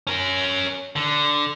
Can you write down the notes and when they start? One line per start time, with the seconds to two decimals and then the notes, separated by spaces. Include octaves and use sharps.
0.07 C#4 A#4
0.96 D3